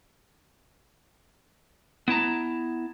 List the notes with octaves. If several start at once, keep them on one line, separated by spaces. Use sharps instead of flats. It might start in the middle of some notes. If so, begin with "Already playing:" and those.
B3 E4 A5 A#5